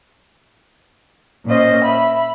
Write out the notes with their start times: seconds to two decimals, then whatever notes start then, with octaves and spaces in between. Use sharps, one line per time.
1.46 A#2 C#4 C5 D#5
1.84 E5 B5